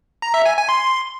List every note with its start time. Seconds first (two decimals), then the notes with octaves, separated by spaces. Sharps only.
0.22 A#5
0.34 E5
0.45 G#5
0.57 G#5
0.69 C6